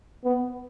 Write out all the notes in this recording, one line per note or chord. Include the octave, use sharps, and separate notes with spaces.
B3